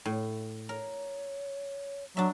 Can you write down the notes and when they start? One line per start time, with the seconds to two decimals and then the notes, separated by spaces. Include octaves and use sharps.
0.05 A2
0.69 A#4 C#5
2.17 F#3 D4 E5